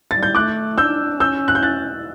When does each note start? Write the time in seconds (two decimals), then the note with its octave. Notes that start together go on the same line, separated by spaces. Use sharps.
0.11 G3 A6
0.23 G6
0.35 A3 D6 F#6
0.78 D4 E6 G6
1.20 C#4 E6 G6
1.48 F#6
1.55 G6
1.63 F#6 A6